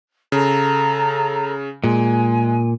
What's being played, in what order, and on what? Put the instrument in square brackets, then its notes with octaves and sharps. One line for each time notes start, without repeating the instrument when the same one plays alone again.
[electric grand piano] C#3 [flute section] A4 A#5
[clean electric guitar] A#2 [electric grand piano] G#3 [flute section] G#5